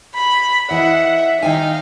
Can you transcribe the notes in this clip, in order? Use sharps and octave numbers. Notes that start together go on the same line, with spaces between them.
B5
E3 D#5 E5 F#5
D#3 D#4 F5 G5 G#5